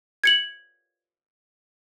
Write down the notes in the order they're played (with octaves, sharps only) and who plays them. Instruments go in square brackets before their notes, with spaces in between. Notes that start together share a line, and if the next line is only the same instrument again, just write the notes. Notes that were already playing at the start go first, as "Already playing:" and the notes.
[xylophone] G#6 C#7 F#7